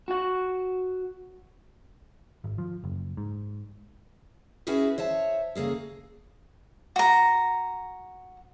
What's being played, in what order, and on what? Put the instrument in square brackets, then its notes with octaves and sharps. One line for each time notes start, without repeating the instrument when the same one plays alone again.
[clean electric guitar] F#4 F#5
[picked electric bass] G#1
F3
F#1
G#2
[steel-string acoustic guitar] C#4 E4 F#4 G#4 B4
C5 C#5 E5 A5
C#3 A#3 G#4 A4
[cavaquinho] F#4 A#5